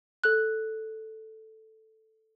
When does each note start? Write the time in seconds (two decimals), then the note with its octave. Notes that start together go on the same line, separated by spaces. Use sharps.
0.24 A4 F#6